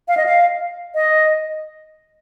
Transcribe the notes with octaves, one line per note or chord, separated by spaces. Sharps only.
F5
D#5
F5
D#5